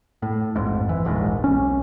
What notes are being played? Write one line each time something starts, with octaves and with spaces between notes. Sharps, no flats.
A2
A1 F2 G#2
E3
D#1 A#1 G#2
B1 C#4